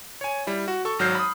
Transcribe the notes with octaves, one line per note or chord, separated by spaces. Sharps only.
C#5 G#5
G3 E4
F#4
A4 C#6
G#1 F#3 F6 G6 C7
B5 D#6